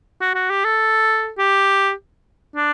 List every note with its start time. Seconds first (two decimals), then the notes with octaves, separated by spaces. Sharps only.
0.21 F#4
0.35 F#4
0.50 G4
0.65 A4
1.38 G4
2.56 D4